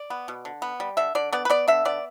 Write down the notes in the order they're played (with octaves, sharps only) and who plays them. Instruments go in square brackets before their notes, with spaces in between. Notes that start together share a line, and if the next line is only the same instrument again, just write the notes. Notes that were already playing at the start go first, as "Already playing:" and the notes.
Already playing: [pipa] D5
B3
B2
D3
B3
G3
D3 E5
D3 D5
B3 D5
B4
B3 D5
D3 E5
B3 D5